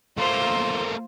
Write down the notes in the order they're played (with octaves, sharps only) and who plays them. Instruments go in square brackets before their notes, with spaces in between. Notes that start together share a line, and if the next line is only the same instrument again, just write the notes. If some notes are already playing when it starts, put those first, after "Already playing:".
[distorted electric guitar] A3 A#3 [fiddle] F4 C5